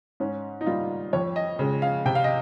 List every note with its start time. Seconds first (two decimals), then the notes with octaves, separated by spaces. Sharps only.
0.20 G#2 C#4
0.61 D#4
0.66 G3 A#3 F4
1.13 F2 C#5
1.36 D#5
1.59 C#3 G#3
1.82 F5
2.05 C3 G5
2.15 F5
2.24 D#5